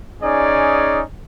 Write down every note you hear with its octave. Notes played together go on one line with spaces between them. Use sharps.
C#4 D#4 G#4 D5